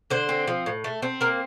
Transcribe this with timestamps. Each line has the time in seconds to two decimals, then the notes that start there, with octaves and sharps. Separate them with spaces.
0.10 D3 C5
0.29 C4
0.47 F3
0.66 A2
0.84 A3
1.02 C4
1.21 A#3 A#4